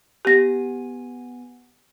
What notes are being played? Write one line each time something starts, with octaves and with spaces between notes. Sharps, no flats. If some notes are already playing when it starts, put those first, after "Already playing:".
B3 G4 G#5 A#6